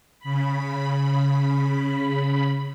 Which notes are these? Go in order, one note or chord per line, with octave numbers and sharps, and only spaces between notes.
C#3 B5